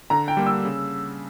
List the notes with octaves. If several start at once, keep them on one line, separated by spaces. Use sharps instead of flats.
D3 A#5
G5
G3 A#3
E6
C#3